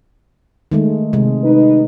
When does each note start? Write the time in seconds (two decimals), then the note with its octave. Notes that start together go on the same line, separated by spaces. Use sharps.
0.72 D#3 G#3 A3
1.13 C3 G#3
1.44 D#4 B4